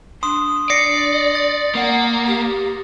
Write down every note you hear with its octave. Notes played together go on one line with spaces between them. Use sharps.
D4 C6 D#6
D5 A#6 C7 C#7
A6
A#3 F#5
G4